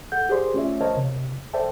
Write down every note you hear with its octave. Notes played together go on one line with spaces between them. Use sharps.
A4 F#5 G6
G4 G#4 A#4 C5 D5 C6
A3 C#4 F4 C#5 D5 E5
A#4 C5 C#5 D#5 F5 A5
C3
A4 C5 D5 E5 G5 A5